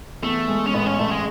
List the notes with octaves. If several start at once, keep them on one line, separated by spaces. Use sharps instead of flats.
E2 A3
G#3
C#4
A1 B3
C#4
A1 A3
G#3